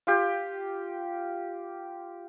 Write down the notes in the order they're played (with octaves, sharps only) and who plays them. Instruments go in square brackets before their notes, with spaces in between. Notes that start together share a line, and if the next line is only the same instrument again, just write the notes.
[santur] F4 G4